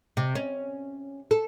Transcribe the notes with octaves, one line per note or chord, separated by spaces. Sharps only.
C3
C#4
A4